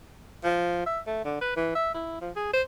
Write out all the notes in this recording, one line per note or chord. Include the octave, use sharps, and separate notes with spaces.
F3
E5
A3
D3
B4
E3
E5
E4
F3
G#4
C5